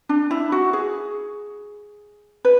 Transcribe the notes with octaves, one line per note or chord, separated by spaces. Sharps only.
D4
E4
F#4
G#4
B4